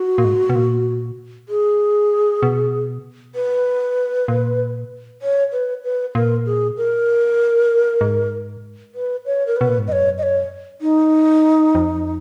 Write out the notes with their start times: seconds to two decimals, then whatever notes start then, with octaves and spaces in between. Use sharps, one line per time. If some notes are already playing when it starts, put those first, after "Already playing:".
Already playing: F#4
0.18 A#2
0.24 G#2
0.50 B2
0.55 A#2
1.49 G#4
2.43 B2
3.35 B4
4.28 A#2
5.22 C#5
5.52 B4
5.84 B4
6.14 A#2 A#4
6.46 G#4
6.77 A#4
8.01 G#2
8.95 B4
9.26 C#5
9.47 A#4
9.57 B2 B4
9.69 A#2
9.78 G#2
9.88 F#2 C#5 D#5
10.18 D#5
10.23 C#5
10.81 D#4
11.75 F2